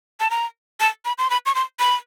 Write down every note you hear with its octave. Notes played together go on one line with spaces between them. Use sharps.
A5
A#5
A5
B5
C6
B5
C#6
C6
B5